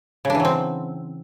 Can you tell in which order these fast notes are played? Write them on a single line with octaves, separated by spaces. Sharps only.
C#3 D4 E3 F#3 C4